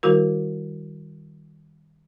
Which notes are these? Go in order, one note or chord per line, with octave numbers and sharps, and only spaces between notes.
D#3 G3 E4 F#4 A#4